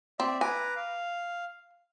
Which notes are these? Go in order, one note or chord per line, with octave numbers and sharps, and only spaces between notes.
C4 D5 E5
B4 G#5 A#5 D6
F5